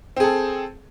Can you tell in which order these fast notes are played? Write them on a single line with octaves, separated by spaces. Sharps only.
C4 G#4 A4